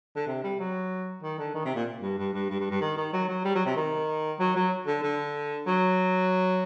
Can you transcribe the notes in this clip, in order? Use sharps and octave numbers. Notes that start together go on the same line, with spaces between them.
D3
C3
G3
F#3
D#3
D3
D#3
C3
A#2
G2
G2
G2
G2
G2
G2
D#3
D#3
F#3
F#3
G3
F#3
C3
D#3
F#3
F#3
D3
D3
F#3